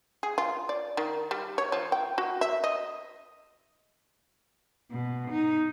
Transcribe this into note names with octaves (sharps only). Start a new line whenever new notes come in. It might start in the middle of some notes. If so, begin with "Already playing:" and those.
G#4
F4
D5
D#3
G3
C#5
F3
G5
F#4
E5
D#5
B2
D#4